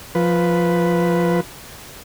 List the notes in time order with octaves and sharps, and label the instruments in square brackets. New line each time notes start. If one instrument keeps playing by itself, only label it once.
[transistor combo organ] F3 B4